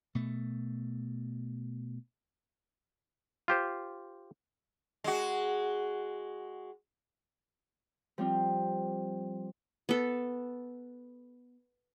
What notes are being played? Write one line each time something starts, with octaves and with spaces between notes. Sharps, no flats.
B2 A3
F4 G4 C5
G#3 F#4
F3 G3 C4 F4
B3 A4